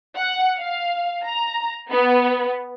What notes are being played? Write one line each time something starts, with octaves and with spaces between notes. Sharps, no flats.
F#5
F5
A#5
B3